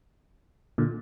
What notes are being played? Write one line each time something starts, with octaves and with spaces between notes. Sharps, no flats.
A#2 D3